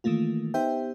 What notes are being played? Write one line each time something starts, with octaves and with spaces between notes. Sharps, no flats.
D#3 E3 A3 A#3 F4
B3 D#4 G4 C5 E5 G5